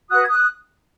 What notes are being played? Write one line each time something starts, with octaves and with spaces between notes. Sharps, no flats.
F#4 B4 D#6 F#6
G#6
D#6 F#6